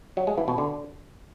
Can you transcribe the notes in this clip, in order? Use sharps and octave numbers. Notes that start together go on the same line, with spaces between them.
F#3
G#3
E3
B2
D3